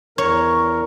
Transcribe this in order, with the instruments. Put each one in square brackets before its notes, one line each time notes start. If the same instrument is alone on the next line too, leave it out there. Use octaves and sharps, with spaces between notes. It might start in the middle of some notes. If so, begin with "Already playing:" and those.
[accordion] E2 A#4 [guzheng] C#5